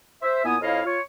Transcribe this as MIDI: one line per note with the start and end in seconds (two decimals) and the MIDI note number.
0.22 0.42 72
0.22 0.42 76
0.44 0.56 46
0.44 0.56 59
0.44 0.56 64
0.44 0.56 80
0.44 0.56 87
0.61 0.80 41
0.61 0.80 64
0.61 0.80 73
0.61 0.80 75
0.61 0.80 77
0.85 0.99 65
0.85 0.99 73